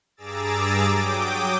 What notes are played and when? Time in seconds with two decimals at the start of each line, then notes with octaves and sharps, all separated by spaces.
0.17 G2 G#4 A#5 D6 E6 A6
0.91 F#3 G5 D6 D#6